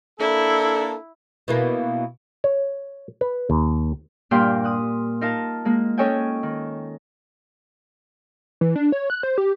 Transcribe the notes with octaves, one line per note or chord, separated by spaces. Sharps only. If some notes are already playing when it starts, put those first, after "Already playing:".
A#3 D4 E4 A4
B2 E3 A#3
C#5
B4
D#2
G2 A#2 F5 G5 C6
D#6 F#6
D#4 F4 A#4 F5 A5
G#3 A#3
C#4 A4 C#5 D#5 G5 G#5
D#3
E3
D4
C#5
F#6
C5
G4